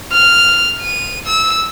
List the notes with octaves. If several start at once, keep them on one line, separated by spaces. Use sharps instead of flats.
F6
D#7
E6